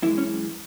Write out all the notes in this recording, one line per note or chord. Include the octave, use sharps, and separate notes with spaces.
F#2 E3 G#3 E4
C#4